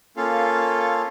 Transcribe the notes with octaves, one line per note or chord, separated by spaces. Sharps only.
A#3 C#4 F4 A4 F5